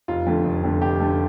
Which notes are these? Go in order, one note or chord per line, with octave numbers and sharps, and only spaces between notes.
F1 F4
F2 D3 A3
F1
F2 D3 A3
F1 G4
D3 A3